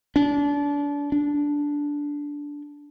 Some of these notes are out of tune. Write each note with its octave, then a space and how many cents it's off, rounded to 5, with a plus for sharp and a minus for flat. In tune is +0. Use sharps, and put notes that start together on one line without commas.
D4 -30
D4 -10